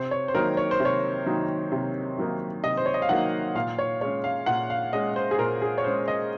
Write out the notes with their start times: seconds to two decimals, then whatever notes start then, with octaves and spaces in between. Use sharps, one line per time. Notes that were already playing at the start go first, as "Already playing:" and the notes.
Already playing: C3 C5
0.11 C#5
0.28 C5
0.35 D#3 F#3 A#3 D#4 A#4
0.57 C#5
0.71 C5
0.80 C3
0.85 C#5
1.26 D#3 F#3 A#3 D#4
1.72 C3
2.18 D#3 F#3 A#3 D#4
2.63 C3 D#5
2.77 C5
2.86 C#5
2.94 D#5
3.02 F5
3.09 D#3 F#3 A#3 D#4 F#5
3.55 A#2 F5
3.79 C#5
4.01 G#3 C#4 C#5
4.24 F5
4.46 A#2 F#5
4.70 F5
4.93 G#3 C#4 D#5
5.16 C5
5.31 G#4
5.38 A#2 A#4
5.62 G#4
5.78 C#5
5.84 G#3 C#4 C5
6.08 D#5